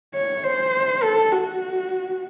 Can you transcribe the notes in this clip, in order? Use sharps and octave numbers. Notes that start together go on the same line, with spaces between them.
C#5
C5
A4
F#4